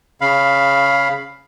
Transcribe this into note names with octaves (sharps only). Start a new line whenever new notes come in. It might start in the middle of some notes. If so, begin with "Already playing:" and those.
C#3 F5 B5